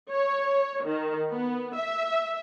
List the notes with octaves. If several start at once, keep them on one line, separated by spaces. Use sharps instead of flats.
C#5
D#3
B3
E5